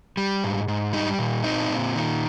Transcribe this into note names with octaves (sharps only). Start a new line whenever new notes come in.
G3
G#2
G#2
G3 D#4
A#2
C4 D#4
A#2
D#3